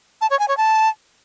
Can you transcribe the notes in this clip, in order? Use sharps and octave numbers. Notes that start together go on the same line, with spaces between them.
A5
C#5
G#5
C#5
A5